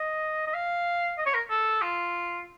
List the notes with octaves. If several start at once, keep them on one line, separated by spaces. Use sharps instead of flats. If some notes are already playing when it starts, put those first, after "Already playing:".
Already playing: D#5
D#5
F5
D#5
C#5
A#4
A4
F4